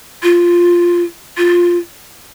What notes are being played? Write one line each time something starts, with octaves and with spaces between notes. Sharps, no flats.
F4
F4